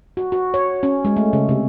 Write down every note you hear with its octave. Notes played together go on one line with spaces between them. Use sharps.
F#4
F#4
C#5
C#4
G#3
A3
C#3
C3